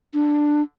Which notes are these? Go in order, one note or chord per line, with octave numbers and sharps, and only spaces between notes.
D4